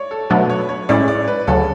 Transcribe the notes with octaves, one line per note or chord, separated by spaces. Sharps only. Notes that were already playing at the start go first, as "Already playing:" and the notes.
Already playing: C#5 D5
A4
B2 F#3 A3 D4 B4
C#5
C#5
A2 G#3 C#4 E4 D5
D5
B4
D2 C#3 F#3 A4